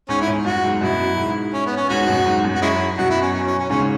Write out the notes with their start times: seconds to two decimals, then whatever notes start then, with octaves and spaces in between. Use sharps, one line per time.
0.09 G#2 C#4
0.21 E4
0.27 G#2
0.45 F#2 F#4
0.64 G#2
0.81 F#2 B2 E4
1.17 G#2
1.54 C#4
1.66 B3
1.77 C#4
1.89 G#2 C#4 F#4
2.07 F#2 B2
2.25 G#2
2.44 F#2
2.55 F#4
2.62 G#3 C#4 E4
2.98 F#2 B2 F#4
3.10 E4
3.22 C#4
3.33 C#4
3.47 C#4
3.59 C#4
3.70 G#2 C#3 C#4